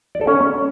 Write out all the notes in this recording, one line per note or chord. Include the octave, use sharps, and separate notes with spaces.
D5
A4
C#4